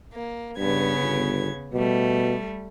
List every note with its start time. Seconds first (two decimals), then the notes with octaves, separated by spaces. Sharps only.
0.14 A#3
0.58 G2 C#3 B3 G#6
1.01 G1
1.73 B2 G3 A3